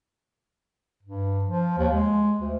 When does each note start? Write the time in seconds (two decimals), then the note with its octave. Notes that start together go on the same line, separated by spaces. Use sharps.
1.03 G2
1.45 F3
1.78 D#2
1.93 G#3
2.40 D2